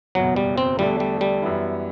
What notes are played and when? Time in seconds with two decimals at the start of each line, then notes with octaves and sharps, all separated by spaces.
0.15 F#1 E2 B2 F#3
0.36 G3
0.58 C4
0.79 E2 D3 G3 A3 D4 A4
1.00 G3
1.21 G3
1.42 F#2 E3 B3 E4